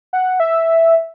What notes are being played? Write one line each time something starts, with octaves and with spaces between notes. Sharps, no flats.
F#5
E5